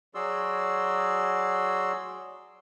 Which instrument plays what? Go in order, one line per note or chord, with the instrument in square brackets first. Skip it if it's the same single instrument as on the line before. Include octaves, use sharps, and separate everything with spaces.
[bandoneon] F#3 F#4 G#4 D5 C6 E6